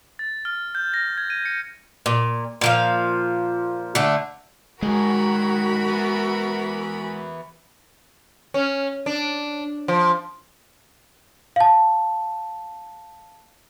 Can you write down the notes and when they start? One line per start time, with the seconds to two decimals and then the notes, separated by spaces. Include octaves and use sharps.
0.19 A6
0.45 F6
0.75 G6
0.94 A#6
1.18 G#6
1.30 D#7
1.45 C#7
2.06 A#2
2.61 A#2 F3 F5
3.95 D3 A3
4.82 D#3 F#3 G#3 F#4 G#4 A#4 B5
5.88 E3 B3
8.54 C#4
9.06 D4
9.88 F3
11.56 F5 A5